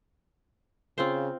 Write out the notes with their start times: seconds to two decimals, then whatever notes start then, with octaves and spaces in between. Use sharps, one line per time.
0.98 C#3 C4 F4 C5